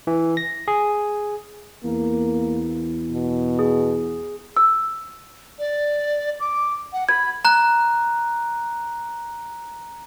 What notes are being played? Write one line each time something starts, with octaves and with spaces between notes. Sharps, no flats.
E3
A#6
G#4
E2 A#3
B2
G#4
E6
D5
D6
F#5
B5 G#6
A#5 F#6